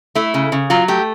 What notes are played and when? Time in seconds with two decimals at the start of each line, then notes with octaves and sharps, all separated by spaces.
0.15 A3 E4
0.34 C#3
0.52 C#3
0.70 F#3 F4
0.88 A3 G4